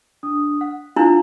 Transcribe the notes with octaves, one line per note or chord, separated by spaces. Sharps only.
D4 D#6
F#5
D4 E4 F4 F5